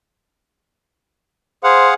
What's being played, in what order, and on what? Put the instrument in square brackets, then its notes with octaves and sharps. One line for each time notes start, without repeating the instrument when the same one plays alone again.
[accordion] G#4 F5 F#5 [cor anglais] C5